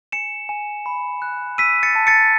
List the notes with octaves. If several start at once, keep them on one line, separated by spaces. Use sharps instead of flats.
G#5 C#7 E7
G#5
B5
F#6
E6 B6 D#7
A6 C#7
A5
A6 C#7